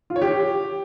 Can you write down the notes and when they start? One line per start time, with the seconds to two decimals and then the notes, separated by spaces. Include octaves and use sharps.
0.10 F4
0.16 C#5
0.22 G4